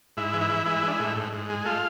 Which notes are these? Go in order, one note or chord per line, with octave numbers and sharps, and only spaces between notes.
G#2 E4
E3
E4
E3
G#3 E4
G#3 D4
E4
A2
G#2
G#2
G#3
A3 F4